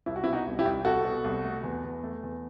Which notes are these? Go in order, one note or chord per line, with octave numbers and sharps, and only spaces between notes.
C2 E4
F#4
E4
B2
D#4 F#4
C2
E4 G4
C2
C2 F#4 A4
B2
C2
A3
E2
E2
A3
E2